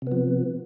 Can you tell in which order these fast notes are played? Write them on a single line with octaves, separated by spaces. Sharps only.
C3 B3 F3